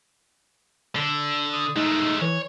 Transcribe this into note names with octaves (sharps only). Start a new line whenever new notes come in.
D3
D#6
G#3 A3 D#4
E3 C#5